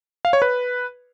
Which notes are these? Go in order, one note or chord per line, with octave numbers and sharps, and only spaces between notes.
F5
C#5
B4